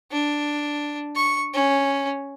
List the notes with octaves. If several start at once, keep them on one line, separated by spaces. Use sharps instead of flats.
D4
C#6
C#4